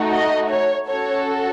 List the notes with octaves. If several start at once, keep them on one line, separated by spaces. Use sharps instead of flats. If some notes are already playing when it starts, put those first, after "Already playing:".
Already playing: A3 D#4 F#4
D#5
C#5
C#4 F#4 A4 C#5